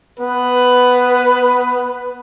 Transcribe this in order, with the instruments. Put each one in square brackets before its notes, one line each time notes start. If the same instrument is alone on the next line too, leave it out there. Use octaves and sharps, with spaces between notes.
[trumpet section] B3 B4